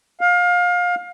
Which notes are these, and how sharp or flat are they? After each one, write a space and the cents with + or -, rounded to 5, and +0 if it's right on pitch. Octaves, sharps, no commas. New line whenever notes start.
F5 +25